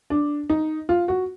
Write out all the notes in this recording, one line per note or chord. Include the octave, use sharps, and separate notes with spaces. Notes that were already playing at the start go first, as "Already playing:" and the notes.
D4
D#4
F4
F#4